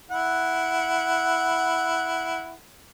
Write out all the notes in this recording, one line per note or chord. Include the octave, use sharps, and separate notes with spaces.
E4 F#5